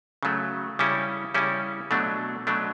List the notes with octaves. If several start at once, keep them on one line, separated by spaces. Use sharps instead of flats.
C#3 F#3 A3
C#3 G3 C#4 E4
C#3 G3 C#4 E4
B2 F#3 A3 D4
B2 F#3 A3 D4